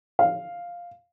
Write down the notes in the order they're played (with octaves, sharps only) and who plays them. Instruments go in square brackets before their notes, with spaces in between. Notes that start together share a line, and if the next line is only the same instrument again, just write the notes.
[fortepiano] F5